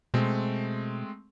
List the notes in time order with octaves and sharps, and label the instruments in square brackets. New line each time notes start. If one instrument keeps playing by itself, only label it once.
[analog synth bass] B2 [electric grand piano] G#3 A3 C4